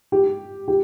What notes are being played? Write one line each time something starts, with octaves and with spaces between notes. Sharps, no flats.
G4
G4